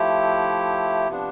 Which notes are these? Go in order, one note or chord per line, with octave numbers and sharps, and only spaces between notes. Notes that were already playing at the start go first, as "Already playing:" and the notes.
Already playing: F3 A3 E4 G4
C3 F3 B3 D4